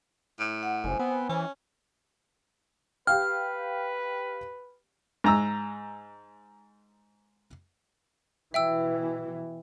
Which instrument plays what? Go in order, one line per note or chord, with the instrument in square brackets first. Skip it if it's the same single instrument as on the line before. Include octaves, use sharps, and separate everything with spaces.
[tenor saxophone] A2
[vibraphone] F#5
[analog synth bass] F#1 [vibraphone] C5 G#5
[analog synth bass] B3 [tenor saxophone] C4
[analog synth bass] E3 [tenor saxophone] C#4
[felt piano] G4 F5 G5 [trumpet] B4 [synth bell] F6
[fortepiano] G#2 A#5 E6
[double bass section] B2 E3 [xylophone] E5 G5 E6